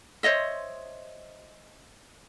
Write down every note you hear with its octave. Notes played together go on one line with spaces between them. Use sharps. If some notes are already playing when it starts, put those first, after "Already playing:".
C5 C#5 D#5 E5